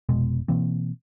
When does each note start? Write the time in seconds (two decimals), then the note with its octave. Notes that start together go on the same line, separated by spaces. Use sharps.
0.09 F1 B2 G#3
0.48 B2 E3 A#3 C4